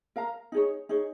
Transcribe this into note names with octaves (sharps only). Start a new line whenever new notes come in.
A#4 F5 A#5
D#4 G#4 C#5
D#4 G#4 C#5